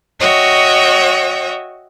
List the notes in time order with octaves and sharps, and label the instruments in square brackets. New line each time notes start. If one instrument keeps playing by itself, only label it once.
[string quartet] F#4 C#5 D#5 E5 G5